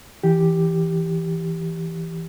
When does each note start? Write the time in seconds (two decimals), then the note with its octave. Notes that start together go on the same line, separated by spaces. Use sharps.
0.23 E3 G4